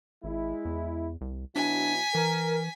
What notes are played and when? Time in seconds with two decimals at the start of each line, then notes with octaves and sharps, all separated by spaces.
0.24 G#1 G#3 E4
0.65 E2
1.21 C2
1.56 B2 F#3 D4 E4 G#5 B6
2.15 E3 A#4